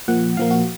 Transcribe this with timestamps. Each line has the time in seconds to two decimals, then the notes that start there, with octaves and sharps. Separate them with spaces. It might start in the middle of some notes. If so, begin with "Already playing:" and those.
0.08 A#2 F3 A#3 F#5
0.37 A#2 F3 A#3 F5
0.51 F#4